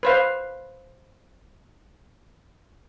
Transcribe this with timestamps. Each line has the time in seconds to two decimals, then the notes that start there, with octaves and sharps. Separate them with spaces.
0.03 B4 C5 F5